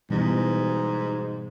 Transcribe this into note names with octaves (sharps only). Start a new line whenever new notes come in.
G#2 B2 E3 G3